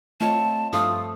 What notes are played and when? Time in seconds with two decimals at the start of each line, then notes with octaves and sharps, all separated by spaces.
0.21 A3 C4 F4 C#5 D#5 A5
0.73 G2 F3 A3 F4 D#6